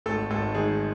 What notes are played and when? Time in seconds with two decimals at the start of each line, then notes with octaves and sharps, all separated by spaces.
0.06 G#1 A3 A4
0.30 G#1 A3 A4
0.54 D#3 G#3 G#4